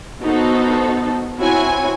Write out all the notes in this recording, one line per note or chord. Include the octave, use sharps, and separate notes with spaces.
B3 D#4 F#4 A4 C5
C4 E4 F#4 C#5 G#5